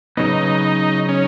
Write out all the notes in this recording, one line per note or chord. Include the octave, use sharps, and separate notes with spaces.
C#3 F#3 B3 D#4
C#4